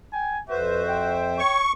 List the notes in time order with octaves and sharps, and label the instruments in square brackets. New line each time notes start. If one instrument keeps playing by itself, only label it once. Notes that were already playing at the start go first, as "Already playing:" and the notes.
[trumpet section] G5 G#5
[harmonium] F2 C5 E5 [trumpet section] F#4 [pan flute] B4
[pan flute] G5
[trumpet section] C#5 [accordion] C#6